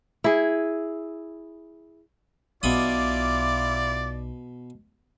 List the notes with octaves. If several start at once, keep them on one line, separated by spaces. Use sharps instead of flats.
E4 G#4
B1 B2 E4 F4 D5 B5 D6 D#6